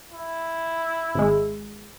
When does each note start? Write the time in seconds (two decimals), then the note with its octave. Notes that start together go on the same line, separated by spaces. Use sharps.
0.12 E4
1.15 G#1 G#3